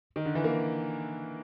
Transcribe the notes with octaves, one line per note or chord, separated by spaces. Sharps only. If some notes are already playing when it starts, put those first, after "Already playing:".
D#3
D3
E3
A#3